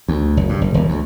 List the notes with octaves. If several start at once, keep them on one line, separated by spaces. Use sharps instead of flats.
D2
F#1
G2
F#1
D#1
D2